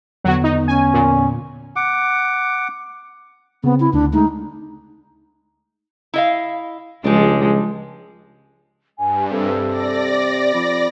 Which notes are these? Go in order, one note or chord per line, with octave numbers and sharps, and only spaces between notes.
E2 D3 F#3 B3 F#4
D#4
C#4 G#5
A#2
F#5 D6
C#3 B3 C4
E4
D2 D4
G#3 A3 D#4
E4 D#5 F5
C#2 F3 G3 G#3 D4
G2 G#5
C3 A4
D5 A#6
F2 B5